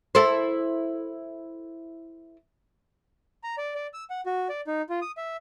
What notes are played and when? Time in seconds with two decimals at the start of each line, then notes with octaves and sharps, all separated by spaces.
0.15 E4 A4 C5
3.44 A#5
3.58 D5
3.75 D5
3.94 E6
4.10 F#5
4.26 F#4
4.49 D5
4.67 D#4
4.90 F4
5.02 D#6
5.17 E5